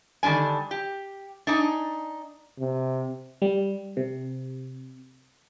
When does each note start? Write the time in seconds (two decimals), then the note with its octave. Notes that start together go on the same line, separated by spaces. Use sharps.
0.23 D3 D#3 G3 D4 G#5
0.71 G4
1.47 D4 D#4 G#5
2.59 C3
3.42 G3
3.97 C3